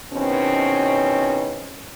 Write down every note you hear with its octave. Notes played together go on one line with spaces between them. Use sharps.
E2 B2 D#3 C4 C#4